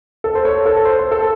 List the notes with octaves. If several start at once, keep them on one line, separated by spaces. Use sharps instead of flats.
A4
C5
A4 C#5
A4
C5
C5
A4